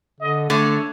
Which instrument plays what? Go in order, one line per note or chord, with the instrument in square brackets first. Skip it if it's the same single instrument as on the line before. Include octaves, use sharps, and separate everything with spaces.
[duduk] D3 [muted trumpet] D#5
[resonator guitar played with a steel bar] D3 [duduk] A3 [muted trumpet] C#5